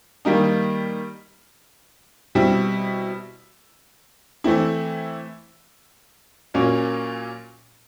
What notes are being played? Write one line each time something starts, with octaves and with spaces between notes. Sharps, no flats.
D#3 G3 A#3 D#4
B2 G3 C4 E4
E3 A3 C4 E4
A#2 F#3 A#3 C#4